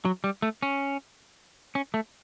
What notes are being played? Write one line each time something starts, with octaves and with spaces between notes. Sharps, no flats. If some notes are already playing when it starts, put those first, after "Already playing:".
F#3
G3
A3
C#4
C#4
A3